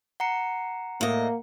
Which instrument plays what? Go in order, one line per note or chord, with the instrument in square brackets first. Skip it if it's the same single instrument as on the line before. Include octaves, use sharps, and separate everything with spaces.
[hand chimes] F#5 A#5 C#7
[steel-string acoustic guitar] A2 D#5 [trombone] A#3